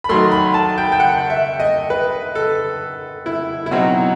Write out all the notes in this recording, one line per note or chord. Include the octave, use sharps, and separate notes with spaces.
B5
D#3 F#3 A3 C6
B5
A5
G5
G5
F#5
E5
D#5
B4
A4
E4
E4
B2 F#3 C4 D#4 F#4